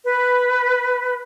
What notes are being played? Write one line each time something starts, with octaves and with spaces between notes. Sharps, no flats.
B4